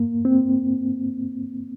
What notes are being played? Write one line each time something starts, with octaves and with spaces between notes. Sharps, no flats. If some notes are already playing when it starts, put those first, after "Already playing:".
Already playing: A#3
C4